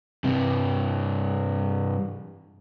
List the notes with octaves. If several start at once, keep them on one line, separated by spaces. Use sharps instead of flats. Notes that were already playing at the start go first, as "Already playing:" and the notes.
G2 C3